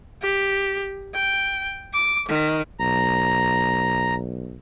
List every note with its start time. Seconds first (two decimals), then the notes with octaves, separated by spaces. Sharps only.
0.22 G4
1.14 G5
1.93 D6
2.28 D#3
2.80 B1 A#5